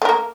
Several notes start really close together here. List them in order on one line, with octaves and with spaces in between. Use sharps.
A3 A#4 A#3